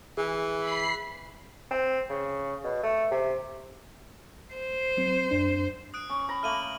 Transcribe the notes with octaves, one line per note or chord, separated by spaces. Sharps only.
E3 G#4
B5 C7
C4
C#3
B2
A3
C3
C5
F#3 C4
F#2 D4
D#6 F#6 D7
C#4 C#6
A#5 B5
A3 A#3 F6 D#7 F#7